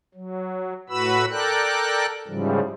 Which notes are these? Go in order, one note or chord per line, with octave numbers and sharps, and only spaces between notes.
F#3
A2 F#4 B4 B5 E6
A4 A#4 D5 G5 F#6
G#2 C#3 E3 F3 G3